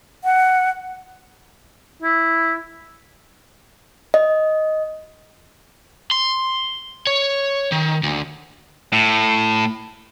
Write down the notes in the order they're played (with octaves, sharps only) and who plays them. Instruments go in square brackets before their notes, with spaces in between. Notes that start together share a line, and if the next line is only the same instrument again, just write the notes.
[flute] F#5
[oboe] E4
[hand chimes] D#5
[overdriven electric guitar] C6
C#5
D#3
D2
[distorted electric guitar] A2